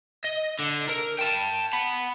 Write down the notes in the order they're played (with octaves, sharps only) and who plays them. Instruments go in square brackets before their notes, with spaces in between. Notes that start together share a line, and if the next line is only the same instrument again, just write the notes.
[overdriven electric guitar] D#5
D3
A#4
G5 A5
F#5 B5